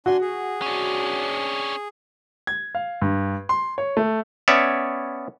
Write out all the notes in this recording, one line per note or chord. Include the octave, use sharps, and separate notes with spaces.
D4 F#4 G#5 C6
G#4
C#4 D4
G#6
F5
G2
C6
C#5
A3
B3 C#4 C#5 D5 E5